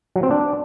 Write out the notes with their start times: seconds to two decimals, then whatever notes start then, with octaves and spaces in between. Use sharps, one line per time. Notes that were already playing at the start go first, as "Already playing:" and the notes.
0.16 F#3
0.23 C4
0.31 D4